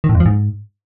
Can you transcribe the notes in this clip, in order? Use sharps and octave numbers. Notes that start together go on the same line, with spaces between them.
D#3
A2
F2
F3
G#2